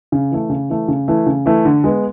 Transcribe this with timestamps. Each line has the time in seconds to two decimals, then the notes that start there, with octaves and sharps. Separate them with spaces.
0.12 C#3
0.31 E3 A3
0.50 C#3
0.70 E3 A3
0.88 C#3
1.08 E3 A3
1.26 C#3
1.46 E3 A3
1.65 D3
1.84 G#3 B3